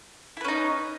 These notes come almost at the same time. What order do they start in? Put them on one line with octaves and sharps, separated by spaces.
E4 B4 C#4 D#4